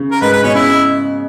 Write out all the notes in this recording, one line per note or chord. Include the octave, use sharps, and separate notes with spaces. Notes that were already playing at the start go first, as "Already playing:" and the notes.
Already playing: C#3
A#4
G#2 B4
B4
B2 C#4
C#3 E4